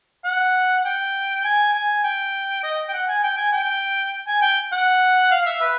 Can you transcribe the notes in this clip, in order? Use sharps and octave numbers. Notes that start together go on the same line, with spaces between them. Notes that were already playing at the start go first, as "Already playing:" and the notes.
F#5
G5
G#5
G#5
G5
D#5
G5
F#5
G#5
G5
G#5
G5
G#5
G5
F#5
F5
E5
B4